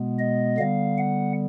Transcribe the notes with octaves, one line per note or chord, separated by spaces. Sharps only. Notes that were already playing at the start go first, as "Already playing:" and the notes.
Already playing: B2 G#3 B3
D#5
D3 G3 B3 F5
F#5